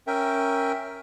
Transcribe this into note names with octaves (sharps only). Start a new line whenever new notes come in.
C#4 A#4 E5 G5